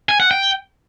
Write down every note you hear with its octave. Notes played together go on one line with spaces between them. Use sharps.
G#5
F#5
G5